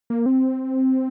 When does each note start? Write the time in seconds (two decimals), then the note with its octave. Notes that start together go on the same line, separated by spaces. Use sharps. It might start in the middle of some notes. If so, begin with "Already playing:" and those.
0.10 A#3
0.26 C4